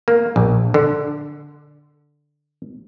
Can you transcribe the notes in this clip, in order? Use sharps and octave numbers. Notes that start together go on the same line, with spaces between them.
A#3
A#1
D3